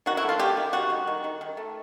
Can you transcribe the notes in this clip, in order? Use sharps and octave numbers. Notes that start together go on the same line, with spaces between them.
D#3 F#4
E4
A3
F4
F#3 G4
D#3
G3 F#4
D#3
D#3
D#3
D#3
A3